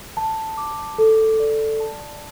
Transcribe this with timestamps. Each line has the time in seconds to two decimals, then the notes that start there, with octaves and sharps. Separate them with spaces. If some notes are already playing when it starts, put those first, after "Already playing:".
0.17 A5
0.57 D6
0.98 A4
1.40 D5
1.80 A5